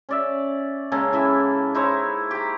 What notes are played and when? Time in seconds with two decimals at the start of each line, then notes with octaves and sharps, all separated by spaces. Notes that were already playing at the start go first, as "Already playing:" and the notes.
0.09 C#4 D5 E5
0.92 C#3 G#3 A#3 A4
1.13 E3 E4 E5
1.75 D#4 E4 C5 C#5
2.31 G4 A#5